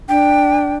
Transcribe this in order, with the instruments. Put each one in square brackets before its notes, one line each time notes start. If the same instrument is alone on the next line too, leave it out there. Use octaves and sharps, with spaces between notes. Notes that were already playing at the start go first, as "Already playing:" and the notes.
[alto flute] D4 [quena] G5